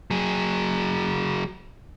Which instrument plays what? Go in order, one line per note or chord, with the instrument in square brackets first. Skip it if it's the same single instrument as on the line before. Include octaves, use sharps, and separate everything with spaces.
[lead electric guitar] F#3 G#4